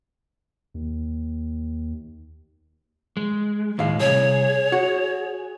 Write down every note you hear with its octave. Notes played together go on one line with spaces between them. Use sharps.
D#2
G#3
D#2 A2 G#3 F5
C2 G#4 C#5
F#4